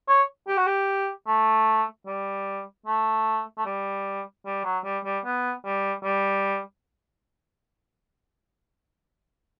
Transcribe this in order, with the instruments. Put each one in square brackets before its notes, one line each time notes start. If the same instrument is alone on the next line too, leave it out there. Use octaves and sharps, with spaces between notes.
[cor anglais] C#5
G4
F#4
G4
A3
G3
A3
A3
G3
G3
F#3
G3
G3
B3
G3
G3